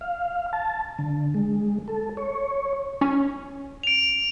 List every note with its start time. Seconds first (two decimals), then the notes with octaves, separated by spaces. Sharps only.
0.01 F5
0.53 A5
0.99 D3
1.34 G#3
1.88 A4
2.17 C#5
3.01 C#4
3.83 D7 F7